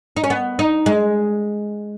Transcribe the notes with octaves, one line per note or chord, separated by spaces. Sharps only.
D#4
C#4
B3
D#4
G#3